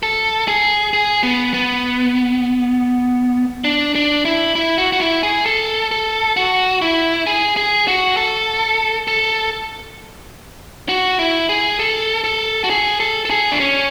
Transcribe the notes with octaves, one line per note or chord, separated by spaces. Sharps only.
A4
G#4
G#4
B3
B3
D4
D4
E4
E4
F#4
F#4
E4
G#4
A4
A4
F#4
E4
G#4
G#4
F#4
A4
A4
F#4
E4
G#4
A4
A4
F#4
G#4
A4
A4
G#4
D4
C#4